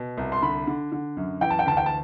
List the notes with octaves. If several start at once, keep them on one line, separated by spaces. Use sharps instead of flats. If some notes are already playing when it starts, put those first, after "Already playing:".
Already playing: B2
C2
C6
D3 B5
D3
D3
F#2
E3 G5
A5
G5
D2 A5
G5
A5